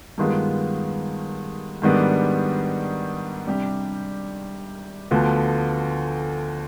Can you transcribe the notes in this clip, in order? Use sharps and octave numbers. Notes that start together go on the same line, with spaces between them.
G2 D#3 G#3 B3 F4
G#2 D#3 G3 B3 D4
C3 G3 D4 G4
D2 D3 F3 B3 F4